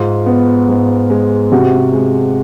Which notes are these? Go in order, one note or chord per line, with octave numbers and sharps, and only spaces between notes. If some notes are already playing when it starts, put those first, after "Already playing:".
Already playing: G#2 F4
B3
G#2
G#3
C3 F#4
G#3